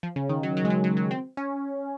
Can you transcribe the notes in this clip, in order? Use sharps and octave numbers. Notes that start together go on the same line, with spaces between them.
F3
C#3
D#3
F#3
F#3
G#3
F#3
F#3
F#3
C4
C#4